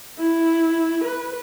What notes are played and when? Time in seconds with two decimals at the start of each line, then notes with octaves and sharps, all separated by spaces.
0.19 E4
1.04 B4